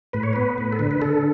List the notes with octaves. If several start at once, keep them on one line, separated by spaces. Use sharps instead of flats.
A2 B4
C#5
B3 B4
A2
A4
D3 B4
B4
D3 A4